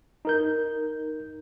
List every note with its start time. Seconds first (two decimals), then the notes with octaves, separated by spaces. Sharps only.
0.25 D#4 A#4 G6